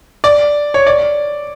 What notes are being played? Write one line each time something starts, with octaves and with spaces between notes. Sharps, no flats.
D5
C#5
D5